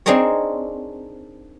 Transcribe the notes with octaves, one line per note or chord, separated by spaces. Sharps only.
C4 D4 D#4 G#4 A#4 C#5